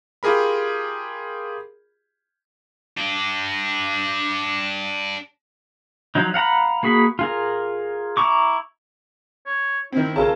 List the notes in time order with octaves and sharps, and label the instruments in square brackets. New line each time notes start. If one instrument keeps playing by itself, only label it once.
[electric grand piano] F4 G4 G#4 A#4 B5
[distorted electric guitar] D4 G4
[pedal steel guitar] F3 F#3 D#4
F5 F#5 A#5 B5
A#3 F#4 G#4 B5
F4 G#4 A#4
E4 A#5 C#6 D6
[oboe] C#5
[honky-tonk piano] D#3 C4 [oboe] E4
[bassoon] C#3 [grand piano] C#4 F4 A#4 [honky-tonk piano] A4 A5